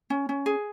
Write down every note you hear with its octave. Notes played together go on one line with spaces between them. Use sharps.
C#4
C#4
G#4